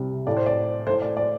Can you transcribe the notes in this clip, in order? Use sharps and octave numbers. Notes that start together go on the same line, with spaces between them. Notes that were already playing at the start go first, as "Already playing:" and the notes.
Already playing: C2 C3 G3
A2 A3 D5
C5
D5
A2 A3 C5
D5
D5